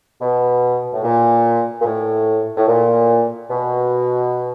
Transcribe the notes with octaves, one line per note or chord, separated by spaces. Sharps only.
B2
A2
A#2
A#2
A2
A2
A#2
B2